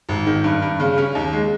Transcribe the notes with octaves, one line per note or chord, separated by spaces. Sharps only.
G#1
D#3
G2
G2
C#3
C#4
D#2
G#3